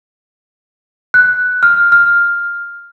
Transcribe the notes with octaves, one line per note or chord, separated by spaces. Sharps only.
F#6
F6
F6